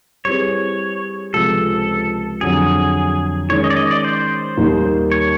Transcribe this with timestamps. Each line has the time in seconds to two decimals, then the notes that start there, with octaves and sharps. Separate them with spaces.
0.25 G3 C4 E4 G#4 B4 C#5
1.33 C#2 C3 F3 G#3 C4 A4
2.41 F2 D3 F#3 G#4
3.49 D#3 G#3 C#4 C#5
3.64 D#5
3.70 D5
3.76 D#5
3.91 D5
4.04 C5
4.57 D#2 D#3 G3 A#3 D#4
5.12 C#5